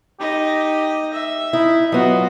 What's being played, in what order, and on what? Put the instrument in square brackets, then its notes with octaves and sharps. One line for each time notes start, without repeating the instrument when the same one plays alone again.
[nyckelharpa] D#4 D#5 [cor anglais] G4
[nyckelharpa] E5
[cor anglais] D#4 [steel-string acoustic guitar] E4
[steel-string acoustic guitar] F#3 B3 [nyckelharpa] F4 F#4 [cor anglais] D#5